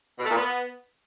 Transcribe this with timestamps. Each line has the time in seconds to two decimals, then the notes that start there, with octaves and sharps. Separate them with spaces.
0.19 B2
0.25 A3
0.30 A#2
0.36 B3